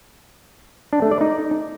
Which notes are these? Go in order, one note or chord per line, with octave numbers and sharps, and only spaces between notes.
D4
A3
D5
D#4